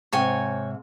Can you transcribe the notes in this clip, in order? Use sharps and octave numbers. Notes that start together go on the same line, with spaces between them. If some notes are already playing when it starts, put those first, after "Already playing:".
G#2 C3 C#5 G5 G#5